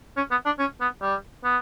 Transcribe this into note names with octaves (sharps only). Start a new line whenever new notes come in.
C#4
B3
D4
C#4
B3
G3
B3